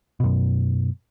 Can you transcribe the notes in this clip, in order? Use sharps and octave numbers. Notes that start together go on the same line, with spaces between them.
F#2 B2